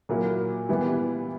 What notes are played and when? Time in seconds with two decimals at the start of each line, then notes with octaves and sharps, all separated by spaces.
0.09 A#2 F#3 A#3 E4
0.69 E3 G3 B3 E4